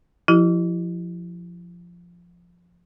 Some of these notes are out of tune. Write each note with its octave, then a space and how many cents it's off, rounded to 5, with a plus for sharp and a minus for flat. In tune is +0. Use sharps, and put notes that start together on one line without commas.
F3 +0 E4 +10 G4 -30